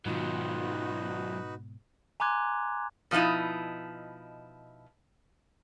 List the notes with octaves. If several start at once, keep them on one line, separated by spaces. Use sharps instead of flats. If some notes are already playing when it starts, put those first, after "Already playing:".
G#2 B2 D#3 F#3 D#4 F4 F#4 B4
G#5 A#5 C6 D6 F#6 G#6
B2 F3 F#3 D#4 E4